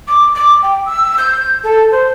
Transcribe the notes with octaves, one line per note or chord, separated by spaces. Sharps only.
D6
D6
G5
E6
G6
A4
C5